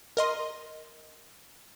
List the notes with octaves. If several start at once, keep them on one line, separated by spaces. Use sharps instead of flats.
A#4 D#5 C6